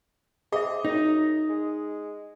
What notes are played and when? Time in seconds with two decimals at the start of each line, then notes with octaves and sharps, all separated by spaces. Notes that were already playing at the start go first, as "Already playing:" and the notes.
0.52 C4 G#4 D#5 E5
0.85 F#2 D#4
1.49 G#3